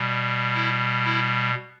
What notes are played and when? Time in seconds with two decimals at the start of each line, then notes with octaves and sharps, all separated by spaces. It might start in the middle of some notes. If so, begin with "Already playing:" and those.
Already playing: B2 G3
0.54 E4
1.05 E4